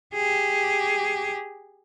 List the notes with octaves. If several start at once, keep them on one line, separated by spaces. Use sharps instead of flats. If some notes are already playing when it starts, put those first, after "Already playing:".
G4 G#4